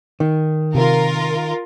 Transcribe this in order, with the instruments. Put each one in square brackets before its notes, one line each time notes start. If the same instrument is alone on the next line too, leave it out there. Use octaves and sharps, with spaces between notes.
[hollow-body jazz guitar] D#3
[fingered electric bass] C3 [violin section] F4 A#4